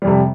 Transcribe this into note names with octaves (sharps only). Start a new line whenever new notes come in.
F2 C3 G3